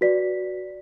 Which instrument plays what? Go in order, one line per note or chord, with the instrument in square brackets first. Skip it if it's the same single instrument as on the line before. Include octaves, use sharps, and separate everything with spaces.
[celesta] F#4 B4 D5 B6